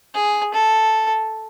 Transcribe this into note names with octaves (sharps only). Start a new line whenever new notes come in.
G#4
A4